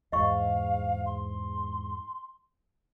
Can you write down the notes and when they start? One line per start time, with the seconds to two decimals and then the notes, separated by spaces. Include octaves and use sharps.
0.12 E2 G#2 D#5 F5 C#6
1.06 C6